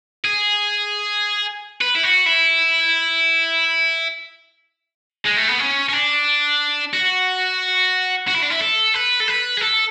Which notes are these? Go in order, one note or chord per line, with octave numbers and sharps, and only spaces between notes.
G#4
B4
E4
F#4
E4
G#3
A3
B3
C#4
C#4
D4
F#4
F#4
E4
D4
E4
A4
B4
A4
B4
G#4
A4